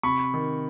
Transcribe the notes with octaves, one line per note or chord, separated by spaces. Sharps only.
C3 B5 C#6
D#3